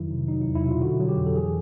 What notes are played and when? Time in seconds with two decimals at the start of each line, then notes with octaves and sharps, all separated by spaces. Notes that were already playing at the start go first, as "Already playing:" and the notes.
Already playing: F2 D#3 F#3 E4
0.11 C3
0.28 F#3 D#4
0.42 E4
0.47 E2
0.55 E4
0.64 B2 F4
0.82 D3 F#4
1.00 F#3
1.09 G4
1.17 F2
1.26 A4
1.35 E3 G#4